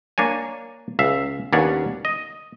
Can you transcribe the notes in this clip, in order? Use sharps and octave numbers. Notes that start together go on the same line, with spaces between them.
A#3 D4 C#5 G#5
C#2 E5 F5
D#2 B3 C#4 D4 C#5 F#5
D#5